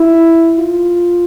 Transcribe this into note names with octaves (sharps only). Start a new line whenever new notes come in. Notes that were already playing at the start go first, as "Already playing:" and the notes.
Already playing: E4
F4